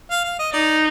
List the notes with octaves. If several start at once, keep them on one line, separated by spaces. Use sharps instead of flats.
F5
F5
D#5
D#4 D5